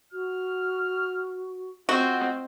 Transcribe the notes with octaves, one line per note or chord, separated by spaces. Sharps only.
F#4 F6
C4 F4 F#4 D#5